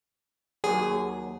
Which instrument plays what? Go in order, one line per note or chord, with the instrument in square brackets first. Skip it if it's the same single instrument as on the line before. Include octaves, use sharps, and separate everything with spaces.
[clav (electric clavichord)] D#2 F#3 [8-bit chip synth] G#4